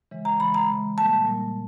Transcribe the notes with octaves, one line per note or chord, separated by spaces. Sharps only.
C#3 E3 G#3
A#5
C#3 E3 G#3 B5
A#5
C#3 E3 G#3
A#2 G3 A#3 A5
A#2 G3 A#3